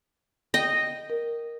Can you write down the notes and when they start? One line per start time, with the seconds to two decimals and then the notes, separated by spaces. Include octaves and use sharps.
0.54 D#5 G5
1.10 A#4